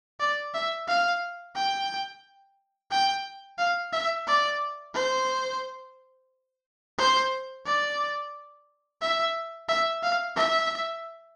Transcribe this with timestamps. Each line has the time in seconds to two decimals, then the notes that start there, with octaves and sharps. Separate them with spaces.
0.20 D5
0.54 E5
0.87 F5
1.55 G5
2.91 G5
3.58 F5
3.93 E5
4.27 D5
4.94 C5
6.98 C5
7.66 D5
9.01 E5
9.69 E5
10.03 F5
10.36 E5